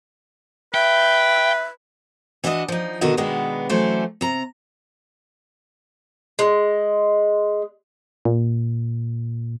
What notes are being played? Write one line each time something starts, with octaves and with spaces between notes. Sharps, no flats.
B4 E5 G5
E3 D4 F#4 D5 D#5
F3 D#4
B2 D3 D#3 F#4 D#5
B2 D#3 G#3 B3 D4
E3 F#3 A3 C#4 C5 D5
C3 A#5
G#3
A#2